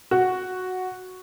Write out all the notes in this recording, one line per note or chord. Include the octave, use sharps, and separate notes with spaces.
F#4